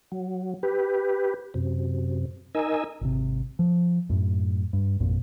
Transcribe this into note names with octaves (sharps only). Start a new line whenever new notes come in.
F#3
G4 B4
F#2 C3
D#4 A#4 D#5 G#5 E6
G#1 C3
F3
F#2 A2
G2
G#1 F2 A#2